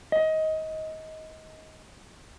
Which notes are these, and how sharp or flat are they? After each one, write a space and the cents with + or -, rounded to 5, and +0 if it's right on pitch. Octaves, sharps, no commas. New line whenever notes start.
D#5 +20